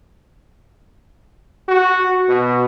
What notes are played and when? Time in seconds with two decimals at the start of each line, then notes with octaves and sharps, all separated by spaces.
1.68 F#4
2.29 B2